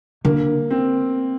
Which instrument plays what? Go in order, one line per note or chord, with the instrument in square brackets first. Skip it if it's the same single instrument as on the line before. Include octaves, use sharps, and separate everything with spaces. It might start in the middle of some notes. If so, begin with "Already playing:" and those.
[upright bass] D3 [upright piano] A#3
[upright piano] C4